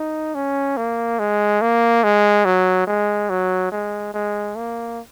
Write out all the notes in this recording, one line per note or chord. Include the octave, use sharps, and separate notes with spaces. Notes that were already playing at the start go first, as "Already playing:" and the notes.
Already playing: D#4
C#4
A#3
G#3
A#3
G#3
F#3
G#3
F#3
G#3
G#3
A#3